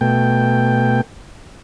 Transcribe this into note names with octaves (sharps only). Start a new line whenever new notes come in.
B2 A3 G5